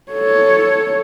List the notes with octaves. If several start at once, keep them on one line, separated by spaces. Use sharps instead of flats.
A4 C#5